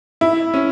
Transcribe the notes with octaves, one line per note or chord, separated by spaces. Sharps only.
E4
C#4